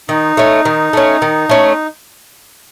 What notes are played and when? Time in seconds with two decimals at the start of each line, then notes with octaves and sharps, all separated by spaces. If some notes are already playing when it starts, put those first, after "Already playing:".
0.09 D#3 D#4
0.37 A3 C#4
0.65 D#3
0.93 A3 C#4
1.22 D#3
1.49 A3 C#4